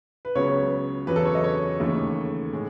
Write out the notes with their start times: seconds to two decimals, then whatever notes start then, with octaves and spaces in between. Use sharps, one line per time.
0.25 B4
0.35 C#2 C#3 F#3 B3 C#5
1.07 E2 C#3 F#3 B4
1.16 A4
1.25 C#5
1.35 D#5
1.44 C#5
1.80 D#2 C#3 E3 A3 D#4
2.52 A2 G#3